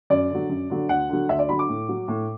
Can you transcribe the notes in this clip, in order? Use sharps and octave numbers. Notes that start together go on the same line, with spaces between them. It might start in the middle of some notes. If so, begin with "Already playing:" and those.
F#2 D5
D3 F#3
F#2
D3 F#3
D2 F#5
D3 F#3
D2 E5
D5
D3 F#3 B5
D6
A2
F#3
A2